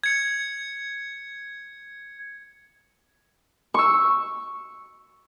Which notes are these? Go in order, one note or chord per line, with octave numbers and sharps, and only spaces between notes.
G#6 C#7
C#6 E6